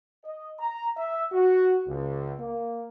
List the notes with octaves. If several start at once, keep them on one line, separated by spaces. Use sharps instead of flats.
D#5
A#5
E5
F#4
C#2
A#3